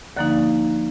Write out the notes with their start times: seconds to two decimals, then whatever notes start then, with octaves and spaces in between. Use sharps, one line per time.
0.17 D2 D3 F3 A#3 D#4